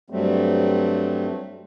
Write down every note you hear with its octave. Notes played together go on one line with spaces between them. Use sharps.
G2 F#3 G3 A3 C4